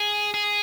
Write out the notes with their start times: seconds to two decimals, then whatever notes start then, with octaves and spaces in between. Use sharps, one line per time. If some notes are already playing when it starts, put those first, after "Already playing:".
Already playing: G#4
0.34 G#4